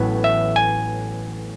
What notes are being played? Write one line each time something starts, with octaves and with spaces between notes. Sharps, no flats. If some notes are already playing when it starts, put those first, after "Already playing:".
Already playing: A1 A2 F#3 B3
E5
G#5